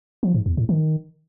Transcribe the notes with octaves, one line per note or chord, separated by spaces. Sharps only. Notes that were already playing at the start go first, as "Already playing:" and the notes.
F3
G#2
E2
A2
D#3